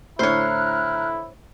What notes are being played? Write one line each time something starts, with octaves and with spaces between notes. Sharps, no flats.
A2 D3 E4 C5 C#5 A#5 F6 F#6